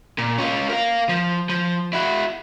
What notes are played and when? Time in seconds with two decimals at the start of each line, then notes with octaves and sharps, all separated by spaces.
0.18 A#2
0.38 C#4 F4
0.70 A#4 F5
1.09 F3
1.49 F3
1.93 E4 F#4